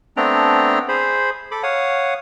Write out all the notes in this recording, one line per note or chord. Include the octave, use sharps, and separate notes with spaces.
A3 B3 C4 D4 G5 A#5
G#4 C5 B5
A4 B5 D6
C#5 F5 F#5 D#6